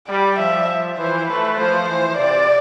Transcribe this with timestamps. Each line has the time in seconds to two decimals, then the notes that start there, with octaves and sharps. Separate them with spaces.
0.08 G3 D5
0.38 F3 E5
0.98 E3 C5
1.28 A3 B4
1.57 F3 C5
1.87 E3
2.17 C3 D5